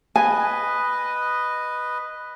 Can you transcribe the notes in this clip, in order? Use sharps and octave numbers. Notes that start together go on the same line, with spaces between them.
B4 D#5 G#5